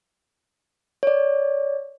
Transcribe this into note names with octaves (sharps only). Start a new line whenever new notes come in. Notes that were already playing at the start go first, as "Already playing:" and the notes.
C#5 D5